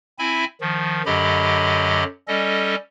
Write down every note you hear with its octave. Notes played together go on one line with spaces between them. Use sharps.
C4 E4 E5 G#5 B5
D#3 F3
F#2 D3 F#3 G4 D#5 B5
G3 C#4 A4 D#5